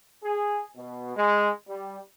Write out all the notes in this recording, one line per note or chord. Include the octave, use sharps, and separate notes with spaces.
G#4
B2
G#3
G3